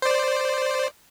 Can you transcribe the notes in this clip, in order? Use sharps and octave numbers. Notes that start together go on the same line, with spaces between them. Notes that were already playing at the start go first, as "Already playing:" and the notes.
C5 D5